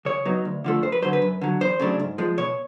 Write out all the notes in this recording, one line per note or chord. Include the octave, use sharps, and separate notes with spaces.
C#3 C#5
F#3 B3 D#4
D2
D3 F3 A3
F2 C5
B4
D3 F#3 C5
B4
F#2
D3 F#3
E2 C5
C#3 F#3 A3 D4
G#2
F3 G#3
B2 C#5